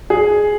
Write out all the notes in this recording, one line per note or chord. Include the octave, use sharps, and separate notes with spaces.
G#4